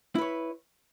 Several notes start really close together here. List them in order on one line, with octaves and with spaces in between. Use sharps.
E4 B4 C#5